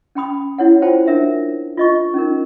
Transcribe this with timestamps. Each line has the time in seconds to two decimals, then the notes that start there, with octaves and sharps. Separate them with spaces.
0.15 C#4 G5 B5 D#6
0.58 E4 C#5 F#5
0.82 F4 C5 G5 A5
1.07 D4 A#4 E5
1.77 F4 D#5 C#6
2.14 C#4 D#4 A#4